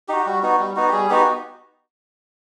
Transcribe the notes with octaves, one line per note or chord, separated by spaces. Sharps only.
D#4 F#4 G4
G3 F#4
B3 D#4 F#4
G3
B3 D#4 F#4
G4
G3 G#4
B3 D#4 F#4 G4